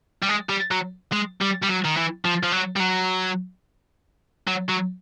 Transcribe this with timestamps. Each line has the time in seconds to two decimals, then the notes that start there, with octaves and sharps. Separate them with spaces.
0.23 G3
0.29 G#3
0.49 G3
0.71 F#3
1.12 G#3
1.41 G3
1.62 G3
1.69 F#3
1.84 D#3
1.97 E3
2.25 F3
2.43 F3
2.52 F#3
2.77 G3
2.80 F#3
4.48 F#3
4.69 F#3